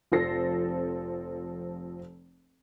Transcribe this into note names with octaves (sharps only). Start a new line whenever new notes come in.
F1 F3 C4 A4 A#6 C7